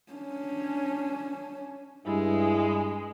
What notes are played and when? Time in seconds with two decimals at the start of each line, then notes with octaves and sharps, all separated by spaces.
0.12 C#4 D4
2.06 G2 G#3 E4